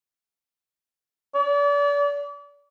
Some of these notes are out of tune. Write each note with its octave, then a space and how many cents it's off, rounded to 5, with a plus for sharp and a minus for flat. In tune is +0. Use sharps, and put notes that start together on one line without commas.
D5 -35